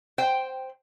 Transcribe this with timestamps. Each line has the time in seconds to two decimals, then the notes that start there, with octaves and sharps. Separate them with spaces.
0.18 C5 G5